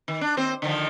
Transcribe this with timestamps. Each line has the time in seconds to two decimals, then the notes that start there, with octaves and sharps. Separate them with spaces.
0.08 D#3
0.21 D4
0.37 D#2 C4 C5
0.62 D3 D#3 F3